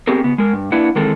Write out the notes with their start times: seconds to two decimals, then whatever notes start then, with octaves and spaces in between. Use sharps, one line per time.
0.07 B3 C4 G4 G#4 A#4
0.24 C#3 B3
0.38 G#3 A#4
0.53 G2
0.72 A#3 D4 E4 B4 F#5
0.96 D#3 E3 G#3 C4 A4 A#4